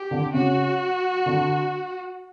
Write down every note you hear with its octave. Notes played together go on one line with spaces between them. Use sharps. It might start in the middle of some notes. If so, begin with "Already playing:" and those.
Already playing: G4
D3
C#3 F#4
D3